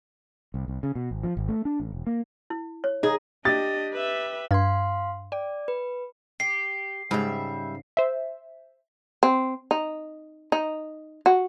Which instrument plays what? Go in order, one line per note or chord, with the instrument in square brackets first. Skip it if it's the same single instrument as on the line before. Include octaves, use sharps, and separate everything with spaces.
[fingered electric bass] C2
C2
C#3
B2
G#1
F3
G#1
A3
D4
A1
E1
A#3
[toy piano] E4
C#5
[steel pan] D#4 [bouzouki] G#4
[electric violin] D4 D#5 [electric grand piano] G4 [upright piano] A6
[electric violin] B4 E5
[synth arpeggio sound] G2 G#6 [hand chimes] F5 C6
[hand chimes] D5 [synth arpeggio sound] G5
[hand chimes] B4
[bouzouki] G4 [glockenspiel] C7
[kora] G#2 C#3 [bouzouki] G3 E5
[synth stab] C5 E5
[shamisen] C4
D#4
D#4
F#4